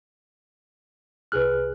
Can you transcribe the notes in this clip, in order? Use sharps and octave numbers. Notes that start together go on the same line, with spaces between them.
C2 G#4 B4 F6 F#6